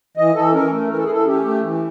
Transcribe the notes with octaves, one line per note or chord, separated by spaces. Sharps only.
E3 D#5
E3 A4
C#4 A#4
A3
E3 A#4
A4
G#4
E3 A4
C#4 G4
A3
E3